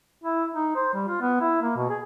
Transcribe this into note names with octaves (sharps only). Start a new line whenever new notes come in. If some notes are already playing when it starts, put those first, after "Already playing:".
E4
D#4
C5
G3
F4
B3
E4
A#3
B2
G#4